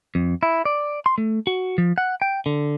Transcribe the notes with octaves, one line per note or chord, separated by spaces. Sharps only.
F2
E4
D5
C6
A3
F#4
F3
F#5
G5
D3